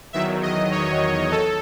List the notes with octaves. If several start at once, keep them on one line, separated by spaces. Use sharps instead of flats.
E2 D#3 F#3 E5
D#5
C#5
A4